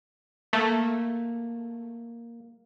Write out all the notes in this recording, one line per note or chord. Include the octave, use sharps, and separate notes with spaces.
A3 A#3